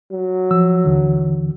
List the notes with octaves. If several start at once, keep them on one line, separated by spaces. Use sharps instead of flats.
F#3
F3 E6
D#2 D3 E3